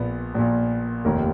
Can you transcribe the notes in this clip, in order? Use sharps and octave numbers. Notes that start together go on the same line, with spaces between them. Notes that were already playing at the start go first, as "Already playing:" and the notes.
Already playing: A#1 A#2 B3
A#1 A#2
F1 D#2 D#3 A#4